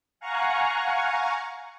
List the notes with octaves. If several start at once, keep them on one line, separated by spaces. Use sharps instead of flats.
F5 F#5 G#5 A#5 C#6